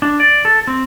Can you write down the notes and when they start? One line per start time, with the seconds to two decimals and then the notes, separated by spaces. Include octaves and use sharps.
0.02 D4
0.20 D5
0.45 A4
0.67 C4